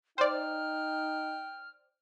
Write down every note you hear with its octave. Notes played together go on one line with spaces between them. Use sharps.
D#4 C5 D5 G5 F6